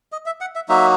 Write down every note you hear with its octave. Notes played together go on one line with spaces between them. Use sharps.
D#5
E5
F#5
E5
F#3 A#3 D#4 F#4 E5